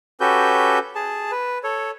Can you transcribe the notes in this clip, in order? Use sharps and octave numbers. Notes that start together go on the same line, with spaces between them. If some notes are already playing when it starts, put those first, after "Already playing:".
C#4 F#4 G4 A4 B4 G6
G#4 A5
B4
A4 C#5